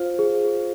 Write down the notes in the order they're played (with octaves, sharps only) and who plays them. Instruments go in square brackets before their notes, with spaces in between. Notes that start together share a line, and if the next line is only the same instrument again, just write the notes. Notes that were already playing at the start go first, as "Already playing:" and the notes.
Already playing: [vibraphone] F4 C5 F5
[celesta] G#4